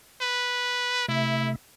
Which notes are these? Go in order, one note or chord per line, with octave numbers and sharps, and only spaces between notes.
B4
C3 A3 E4 E5